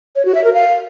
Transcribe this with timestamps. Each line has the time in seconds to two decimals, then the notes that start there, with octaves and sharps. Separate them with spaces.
0.16 C#5
0.25 F#4
0.35 E5
0.44 A#4
0.54 F5